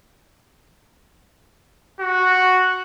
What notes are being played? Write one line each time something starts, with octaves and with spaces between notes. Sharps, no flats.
F#4